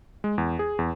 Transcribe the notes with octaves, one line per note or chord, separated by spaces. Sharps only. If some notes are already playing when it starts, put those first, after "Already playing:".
G#3
E2
G#4
E2